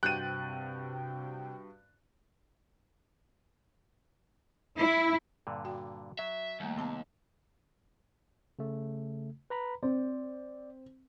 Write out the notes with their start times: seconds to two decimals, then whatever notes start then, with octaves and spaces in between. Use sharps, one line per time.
0.03 G2 C3 F#4 G5 F#6 A6 D#7
4.78 E4
5.47 G2 A#2 D3
5.65 F#4 G5
6.19 F#3 E5
6.60 D#2 G3 A3 A#3
6.77 C3 B3 A5 A#5
8.59 C#3 A3
9.50 B4 A#5 B5
9.83 C4 D5